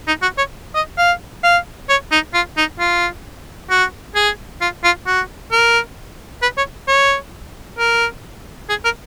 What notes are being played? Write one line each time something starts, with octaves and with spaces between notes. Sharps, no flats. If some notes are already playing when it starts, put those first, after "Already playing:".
D#4
F#4
C#5
D#5
F5
F5
C#5
D#4
F4
D#4
F4
F#4
G#4
F4
F4
F#4
A#4
B4
C#5
C#5
A#4
G#4
A#4